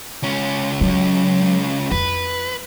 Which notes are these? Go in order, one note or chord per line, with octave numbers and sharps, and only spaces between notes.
C#2 C#4
F#3
F2 B4